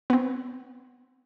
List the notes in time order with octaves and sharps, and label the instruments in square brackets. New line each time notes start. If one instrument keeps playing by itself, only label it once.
[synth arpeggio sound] B3 C4